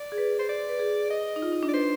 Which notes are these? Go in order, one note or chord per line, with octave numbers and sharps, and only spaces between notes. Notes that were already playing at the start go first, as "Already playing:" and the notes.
Already playing: D5
G#4
B4
C5
D5
B4
G#4
D#5
D#4
F4
D#4
D4
D5
B4 C5